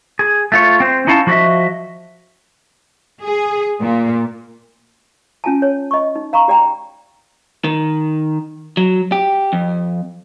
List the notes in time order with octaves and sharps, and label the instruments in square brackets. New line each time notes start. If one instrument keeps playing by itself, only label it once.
[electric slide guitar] G#4
A3 F4 C#5
C4 C5
C#4 D#4 E4 F5 G#5 A5
F3 F#4 G4 A#4 D#5 E5
[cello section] G#4
A#2
[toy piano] C#4 F4 G#5 A5
C#5
D#5 C#6
D#4
F5 A#5 B5 C#6
G4 D5 G5 A#5
[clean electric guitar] D#3
F#3
G4
F2